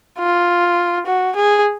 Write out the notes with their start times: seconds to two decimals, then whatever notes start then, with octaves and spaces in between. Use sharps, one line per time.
0.19 F4
1.06 F#4
1.36 G#4